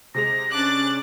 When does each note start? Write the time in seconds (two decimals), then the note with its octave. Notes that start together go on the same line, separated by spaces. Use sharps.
0.15 C3 G#3 A#6 F7
0.52 C#4 D4 D6 F#6 A6